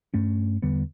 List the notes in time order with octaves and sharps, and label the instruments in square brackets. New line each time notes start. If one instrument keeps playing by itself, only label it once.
[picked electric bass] G2 A3 C#4
E2 D3 G3 B3